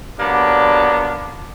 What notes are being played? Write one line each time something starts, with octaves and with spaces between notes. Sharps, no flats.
D3 F#3 G3 A#3 B3 D4